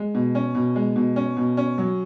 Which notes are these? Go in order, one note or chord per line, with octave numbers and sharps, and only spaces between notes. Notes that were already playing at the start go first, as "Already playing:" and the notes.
Already playing: G#3
B2
C#4
B2
G#3
B2
C#4
B2
C#4
F#3